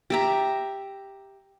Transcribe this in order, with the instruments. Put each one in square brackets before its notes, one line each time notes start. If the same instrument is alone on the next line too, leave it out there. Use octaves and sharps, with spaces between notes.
[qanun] G4 E5 A#5